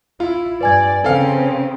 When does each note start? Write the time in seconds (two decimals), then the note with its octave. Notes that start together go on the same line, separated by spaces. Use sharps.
0.20 E4 F4
0.61 G2 B4 D5 G#5 G#6
1.04 C#3 C4 A4 F5